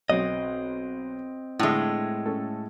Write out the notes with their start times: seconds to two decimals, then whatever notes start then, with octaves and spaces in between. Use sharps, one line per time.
0.10 B1 C4 C#5 D#5
1.59 A2 D3 G#3 E5
2.26 C#4 A4